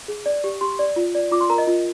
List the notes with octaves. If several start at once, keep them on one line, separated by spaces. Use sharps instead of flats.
G#4
D5
G4
G4 C6
D5
F4
D5
F4 D6
C6
A#4 A#5
D#5
F4